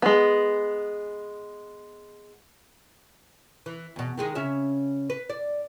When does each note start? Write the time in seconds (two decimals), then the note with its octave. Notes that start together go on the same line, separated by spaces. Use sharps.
0.02 G#3 B3
3.66 E3
3.96 E2 B2
4.18 D#3 G#3 G#4
4.35 C#3 C#4 E5
5.10 B4
5.29 D5